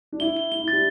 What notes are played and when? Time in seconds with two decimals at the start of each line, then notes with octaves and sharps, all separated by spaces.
0.12 D4
0.20 E4 G7
0.37 G7
0.52 E4 G7
0.62 E4
0.68 D4 G4 A6